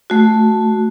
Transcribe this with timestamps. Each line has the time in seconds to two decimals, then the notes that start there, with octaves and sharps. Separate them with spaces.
0.10 A3 F#4